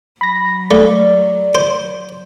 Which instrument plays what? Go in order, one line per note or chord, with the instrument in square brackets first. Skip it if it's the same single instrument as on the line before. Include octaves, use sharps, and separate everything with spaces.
[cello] F#3 [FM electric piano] B5 A#6
[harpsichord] A3 [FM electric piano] D5
[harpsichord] C5